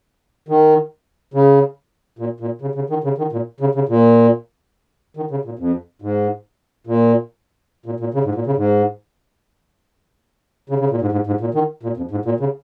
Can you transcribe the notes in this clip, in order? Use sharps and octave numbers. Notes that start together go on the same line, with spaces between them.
D#3
C#3
A#2
A#2
C#3
C#3
D#3
C#3
D#3
A#2
C#3
C#3
A#2
D#3
C#3
A#2
F2
G#2
A#2
A#2
A#2
C#3
G#2
A#2
C#3
G#2
C#3
C#3
A#2
G#2
G#2
G#2
A#2
D#3
A#2
F2
G#2
A#2
C#3